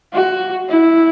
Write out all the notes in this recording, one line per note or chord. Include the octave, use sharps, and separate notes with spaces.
F#4
E4